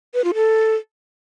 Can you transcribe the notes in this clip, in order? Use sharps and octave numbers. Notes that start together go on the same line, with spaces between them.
B4
F4
A4